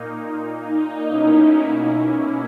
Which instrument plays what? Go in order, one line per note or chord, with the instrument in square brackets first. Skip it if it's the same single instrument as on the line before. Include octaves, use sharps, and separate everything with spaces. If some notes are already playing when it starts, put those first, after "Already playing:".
Already playing: [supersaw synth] A#2 A#3 D#4
[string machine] D#4
[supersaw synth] B2 A#3 C#4 E4
[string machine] C#4